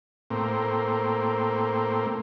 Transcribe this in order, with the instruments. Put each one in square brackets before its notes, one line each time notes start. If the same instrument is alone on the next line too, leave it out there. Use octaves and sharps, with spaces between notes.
[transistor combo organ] A2 A#3 C4